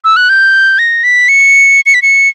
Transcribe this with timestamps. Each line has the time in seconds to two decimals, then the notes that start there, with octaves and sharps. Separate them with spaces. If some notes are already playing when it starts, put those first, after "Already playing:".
0.04 E6
0.17 F#6
0.29 G6
0.79 A#6
1.04 B6
1.29 C#7
1.86 C#7
1.94 B6
2.02 C#7